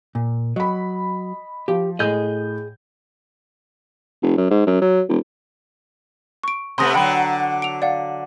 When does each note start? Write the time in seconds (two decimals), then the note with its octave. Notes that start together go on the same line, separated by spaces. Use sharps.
0.15 A#2
0.56 F#3 D#5 B5
1.68 F3 G4
1.99 A2 G#4 D#5 G6
4.22 F1
4.37 F#2
4.50 G#2
4.66 F#2
4.81 F#3
5.09 E1
6.44 C#6 D7
6.78 C3 A3 B3 C6 D#6 A#6
6.94 D3 F#3 F#5 G5 B5
7.62 D7 F7
7.82 D5 F5 F#5